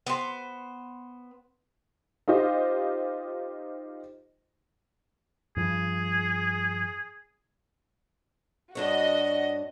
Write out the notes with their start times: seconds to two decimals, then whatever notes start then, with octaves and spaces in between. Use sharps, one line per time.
0.07 B3 C5
2.28 D#4 F4 G4 C5 D#5
5.57 G2 F3 G#4
8.75 G2 D4 F#4 C#5 D#5